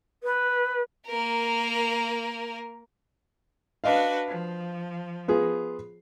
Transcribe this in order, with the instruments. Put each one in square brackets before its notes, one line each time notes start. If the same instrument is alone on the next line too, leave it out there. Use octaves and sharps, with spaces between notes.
[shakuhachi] B4
[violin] A#3 A#4
[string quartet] D4 F#4 B4 [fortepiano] D#5 F5
[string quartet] F3
[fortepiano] B3 F4 G#4